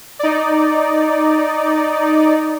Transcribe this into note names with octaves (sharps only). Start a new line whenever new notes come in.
D#4 D5